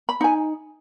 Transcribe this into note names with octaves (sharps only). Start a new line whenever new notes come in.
B5
D#4 G#5